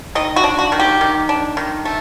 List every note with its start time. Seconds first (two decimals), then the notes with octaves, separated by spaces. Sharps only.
0.15 D#3 D#5
0.36 F#4
0.44 D4
0.59 F#4
0.72 D#3
0.80 G4
1.01 D#3
1.29 D4
1.57 D#3
1.85 A3